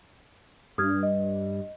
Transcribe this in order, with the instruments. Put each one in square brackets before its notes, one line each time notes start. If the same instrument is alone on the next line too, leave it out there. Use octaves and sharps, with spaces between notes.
[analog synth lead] G2 [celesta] D#6 F6 G#6
[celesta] D#5